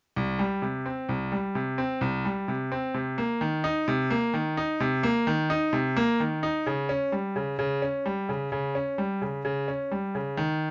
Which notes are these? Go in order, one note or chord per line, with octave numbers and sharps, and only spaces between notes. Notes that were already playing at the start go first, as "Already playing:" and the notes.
C2
G3
C3
C4
C2
G3
C3
C4
C2
G3
C3
C4
C3
A#3
D#3
D#4
C3
A#3
D#3
D#4
C3
A#3
D#3
D#4
C3
A#3
D#3
D#4
C#3
C#4
G3
C#3
C#3
C#4
G3
C#3
C#3
C#4
G3
C#3
C#3
C#4
G3
C#3
D#3